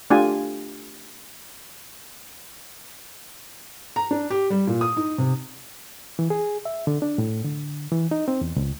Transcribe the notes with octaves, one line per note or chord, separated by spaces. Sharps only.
A3 D4 F4 G4 G#5
A#5
D4
G4
G3
A#2
D#6
D#4
C3
E3
G#4
E5
D3
D4
A2
D3
E3
D#4
C4
E2
C#2